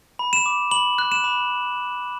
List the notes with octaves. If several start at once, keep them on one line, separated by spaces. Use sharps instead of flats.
B5
E7
D6
B5 F#7
F#6
E7
B5